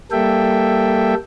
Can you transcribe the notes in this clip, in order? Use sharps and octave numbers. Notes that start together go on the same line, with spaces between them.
G3 A#3 A4 E5 G5